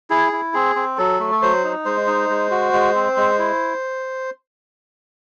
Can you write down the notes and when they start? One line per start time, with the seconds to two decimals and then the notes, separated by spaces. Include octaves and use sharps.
0.10 E4 G#4
0.32 E4
0.54 C4 G#4
0.76 C4
0.98 F#3 A4
1.20 A3
1.32 A4
1.42 F#3 C5
1.64 D#4
1.85 G#3 C5
2.07 D#4
2.29 G#3
2.51 F#4
2.73 G#3
2.95 C4
3.17 G#3
3.39 E4